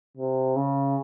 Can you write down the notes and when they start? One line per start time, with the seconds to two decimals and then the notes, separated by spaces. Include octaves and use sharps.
0.17 C3
0.56 C#3